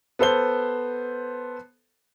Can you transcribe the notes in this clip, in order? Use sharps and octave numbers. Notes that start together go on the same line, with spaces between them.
B3 A4 C5 G7